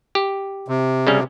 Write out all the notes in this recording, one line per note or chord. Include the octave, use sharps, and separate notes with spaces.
G4
C3
C#3 G3 C#4